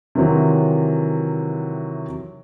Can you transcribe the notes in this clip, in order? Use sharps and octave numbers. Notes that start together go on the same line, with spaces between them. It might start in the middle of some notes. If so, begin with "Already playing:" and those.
C3 D#3 E3 F#3 C4